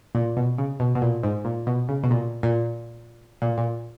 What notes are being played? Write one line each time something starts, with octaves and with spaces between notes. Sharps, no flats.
A#2
B2
C#3
B2
B2
A#2
G#2
A#2
B2
C#3
B2
A#2
A#2
A#2
A#2